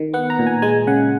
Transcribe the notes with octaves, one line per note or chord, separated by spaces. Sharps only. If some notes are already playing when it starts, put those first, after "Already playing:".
Already playing: D#3
B3 F#5
A#5
A#2
G#5
G#3 G#5
C#3 F#5